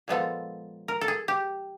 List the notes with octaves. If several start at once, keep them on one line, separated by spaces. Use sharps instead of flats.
A#2 F3 G#3 B3 A4
A#4
A4
G#4
G4